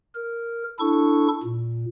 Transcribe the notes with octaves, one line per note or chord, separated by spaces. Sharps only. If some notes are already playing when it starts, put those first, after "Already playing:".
A#4
D4 E4 A4 C#6
A#2